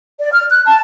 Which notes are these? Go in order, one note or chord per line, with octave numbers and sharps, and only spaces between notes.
D5
F6
F#6
A5